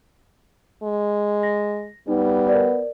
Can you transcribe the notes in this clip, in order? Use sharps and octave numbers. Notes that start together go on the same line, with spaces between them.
G#3
A#6
G3 B3 D#4
A#4 C5 D5